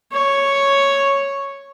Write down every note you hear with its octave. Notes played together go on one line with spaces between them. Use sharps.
C#5